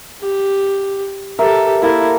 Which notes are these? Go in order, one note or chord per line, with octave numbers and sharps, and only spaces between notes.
G4
G4 A4 A#4 E5
A#3 E4 A4 A#4